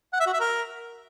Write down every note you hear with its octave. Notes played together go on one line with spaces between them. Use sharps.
F#5
E5
F#4
E5
A#4